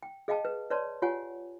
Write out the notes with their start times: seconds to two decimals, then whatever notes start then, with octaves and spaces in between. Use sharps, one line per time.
0.03 G5
0.28 G#4 D#5 F5 G5 A5
0.45 B4
0.70 B4 C#5 D5 A5 C6
1.02 F4 G4 C#5 F#5 G#5